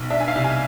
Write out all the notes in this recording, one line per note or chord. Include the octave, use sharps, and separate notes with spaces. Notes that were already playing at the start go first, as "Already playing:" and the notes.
Already playing: B1
D4 E5
G#5
F5
C2
G#5